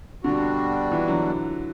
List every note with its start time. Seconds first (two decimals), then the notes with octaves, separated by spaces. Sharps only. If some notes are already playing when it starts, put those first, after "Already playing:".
0.24 B2 D3 G3 D4 F#4
0.91 E3
1.08 D3 F#3